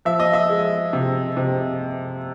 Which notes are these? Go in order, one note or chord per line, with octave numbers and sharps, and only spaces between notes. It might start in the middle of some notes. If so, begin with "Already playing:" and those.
F3 E5
D#5
E5
G#3
C3
C3